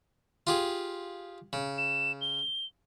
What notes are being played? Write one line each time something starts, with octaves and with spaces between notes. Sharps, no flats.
F4 G4 G#4
C#3
E7
G7